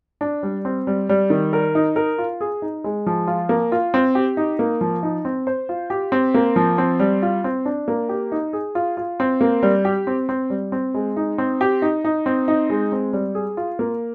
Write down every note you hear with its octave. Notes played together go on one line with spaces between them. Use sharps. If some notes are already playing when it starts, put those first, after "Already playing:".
D4
G3
C4
G3
G3
D#3
A#4
D#4
A#4
F4
G#4
D#4
G#3
F3
F4
A#3
F4
C4
G4
D#4
A#3
F3
D#4
C4
C5
F4
G4
C4
A#3
F3
C4
G3
F4
C4
D4
A#3
G4
D#4
G#4
F4
F4
C4
A#3
G3
G4
C4
C4
G3
C4
G#3
D#4
C4
G4
D#4
D#4
C4
D#4
G#3
C4
G3
G#4
F4
A#3